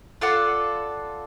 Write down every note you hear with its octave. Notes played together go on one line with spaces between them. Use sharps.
F4 A4 D5 F#5